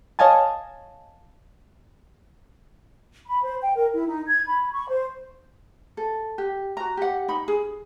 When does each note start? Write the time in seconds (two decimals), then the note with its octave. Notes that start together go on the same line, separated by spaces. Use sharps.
0.19 C#5 D#5 F5 G#5 A5
3.26 B5
3.43 C5
3.62 G5
3.75 A#4
3.94 E4
4.07 D#4
4.27 G#6
4.47 B5
4.73 C#6
4.88 C5
5.97 A4
6.38 G4
6.77 F#4 A#5
6.97 G4 F#5
7.28 D#4 B5
7.48 G#4